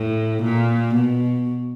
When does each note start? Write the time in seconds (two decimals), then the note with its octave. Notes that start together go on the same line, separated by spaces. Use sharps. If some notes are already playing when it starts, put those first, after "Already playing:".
Already playing: A2
0.42 A#2
0.95 B2